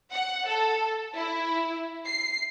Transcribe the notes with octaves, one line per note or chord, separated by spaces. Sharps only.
F#5
A4
E4
C7